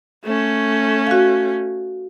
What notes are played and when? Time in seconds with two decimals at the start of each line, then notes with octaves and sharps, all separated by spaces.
0.25 A3 C#4
1.07 F#4 F5